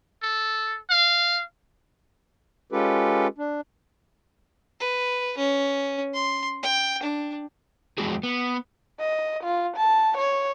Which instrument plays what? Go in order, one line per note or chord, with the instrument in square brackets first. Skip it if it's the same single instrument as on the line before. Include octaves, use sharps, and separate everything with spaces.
[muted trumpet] A4
F5
[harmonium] G#3 C#4 F4 G4 A4 B4
D4
[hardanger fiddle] B4
C#4
C6
G5
D4
[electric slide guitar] F2 G#3 F#4 G#4
B3
[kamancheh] D#5
F4
A5
C#5